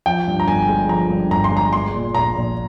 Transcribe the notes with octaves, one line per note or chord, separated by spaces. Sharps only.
F3 G5
G2
A#5
G1 G#5
G#3
F3 A#5
G2
G1 A#5
C6
G#3
A#5
G#3 C6
A#2
A#1 A#5
A#1